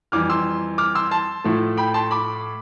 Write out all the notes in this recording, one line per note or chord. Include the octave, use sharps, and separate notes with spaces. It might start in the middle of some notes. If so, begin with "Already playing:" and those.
F2 E3 G3 D6 F6
C6 E6
D6 F6
C6 E6
A5 C6
A2 F3 A3
G5 B5
A5 C6
B5 D6